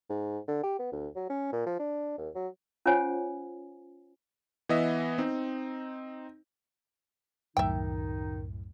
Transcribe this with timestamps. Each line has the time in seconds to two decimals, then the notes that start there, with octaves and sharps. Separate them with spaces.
0.09 G#2
0.48 D3
0.64 G4
0.79 B3
0.92 D2
1.16 F#3
1.30 C#4
1.52 A#2
1.66 F3
1.79 D4
2.18 D#2
2.35 F#3
2.86 C#4 F4 C5 C#5 F#5 G#5
4.69 E3 B3 D#5 E5
5.18 C4 D#4
7.57 C2 F#2 A2 D#3 D#4 E5 G5